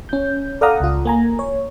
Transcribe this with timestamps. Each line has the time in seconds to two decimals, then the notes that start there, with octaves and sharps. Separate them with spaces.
0.09 C#4 G6
0.61 A4 D5 F5 F#5 A#5 D#6
0.80 C#2 F4
1.05 A#3 G#5 A#5
1.39 C#5